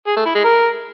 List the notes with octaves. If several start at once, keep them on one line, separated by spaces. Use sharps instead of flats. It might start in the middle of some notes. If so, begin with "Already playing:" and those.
G#4
A3
E4
G#3
A#4